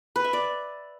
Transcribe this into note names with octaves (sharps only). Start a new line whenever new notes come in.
B4
E5
D5